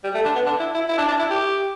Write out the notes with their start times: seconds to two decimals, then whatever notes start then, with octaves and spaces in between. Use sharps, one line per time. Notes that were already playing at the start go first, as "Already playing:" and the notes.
0.04 G3
0.14 A3
0.25 D4
0.35 B3
0.46 D4
0.60 E4
0.74 E4
0.88 E4
0.98 D4
1.08 D4
1.19 E4
1.30 G4